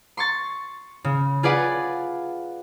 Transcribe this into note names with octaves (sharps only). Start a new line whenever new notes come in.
C6 C#6 A6
C#3
F4 G#4 B4 D5 F#5